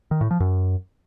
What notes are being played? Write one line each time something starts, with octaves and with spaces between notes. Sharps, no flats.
D#3
A2
F3
F#2